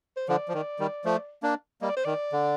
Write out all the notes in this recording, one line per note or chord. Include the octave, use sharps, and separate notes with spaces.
C5
D3 F3 D5
F3
D#3
D#3 G3
F3 A3
A#3 D4
G3 A#3 D#5
D5
C5
D#3 D5
D3